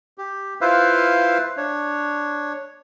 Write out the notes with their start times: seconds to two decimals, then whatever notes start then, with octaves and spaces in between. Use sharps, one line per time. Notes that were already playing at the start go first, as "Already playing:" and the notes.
0.18 G4
0.61 E4 F4 B4 C5 E5 F5
1.57 D4 C#5